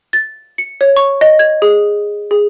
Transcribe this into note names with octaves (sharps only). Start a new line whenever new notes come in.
A6
C#7
C#5
C#6
D#5
G#6
G#4
G#4